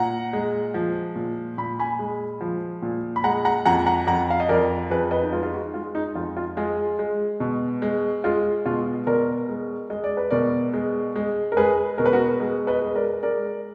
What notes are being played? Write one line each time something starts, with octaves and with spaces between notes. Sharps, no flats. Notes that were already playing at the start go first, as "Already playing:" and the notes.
Already playing: A#2 F#5 A#5
G#3
F3
A#2
A#2 B5
G#5 B5
G#3
F3
A#2
B5
G#3 F#5 A#5
F#5 A#5
F2 F#5 A#5
F#5 A#5
F2 F#5 A#5
F5
D#5
F2 A#4 D5
F2 G#4 B4
B4 D#5
D#4
G#3 F4
F4
D#4 F#4
G#3 F4
D#4
F2 F4
F4
G#3 F4 G#4
G#3
B2
G#3
G#3 F4
B2 F4
B2 A#4 D5
G#3
G#3 D#5
D5
B4
B2 A#4 D5
G#3
G#3
A#4
G#3 G#4 B4
B2 A#4
B4
F#4 A#4
G#3
B4 D#5
G#3
A#4 D5
G#3 A#4 D5